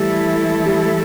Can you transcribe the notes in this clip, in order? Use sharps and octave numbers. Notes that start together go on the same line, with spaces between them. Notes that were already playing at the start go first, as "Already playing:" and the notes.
Already playing: E3 G3 A3 E4 A4
G3